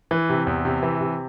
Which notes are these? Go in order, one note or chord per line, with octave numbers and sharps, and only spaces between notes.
E3
C3
E2
C3
E3
C3